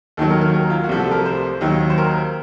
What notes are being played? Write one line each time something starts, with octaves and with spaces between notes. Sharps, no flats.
D#2 D#3 F#3 A4
A#4
A#4
A#4
F4
F#4
C2 C3 F3 A3
A4
A#4
C5
D#2 D#3 F#3
C5
A#4